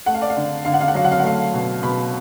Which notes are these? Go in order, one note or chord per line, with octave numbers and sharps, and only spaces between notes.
A3 F#5
F5
D5
F5
D3
D3 F5
F#5
F5
F#5
F#3 F5
F#5
F5
F#5
A3 F5
B2
B2 B5